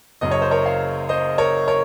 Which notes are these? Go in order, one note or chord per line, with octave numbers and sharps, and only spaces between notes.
F#1 F#2 C#3 D#5
C#5
C5
A#4 C#5
C#5 F5
C5 D#5
A#4 C#5
A#4 C#5